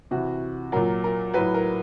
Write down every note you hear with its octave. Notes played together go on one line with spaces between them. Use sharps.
C3 E3 F#4
A#2 F#3 A#4
A#4
A2 F#3 B4
A#4